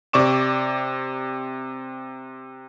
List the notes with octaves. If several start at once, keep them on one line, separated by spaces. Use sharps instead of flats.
C3 D5 C#6 D6 E7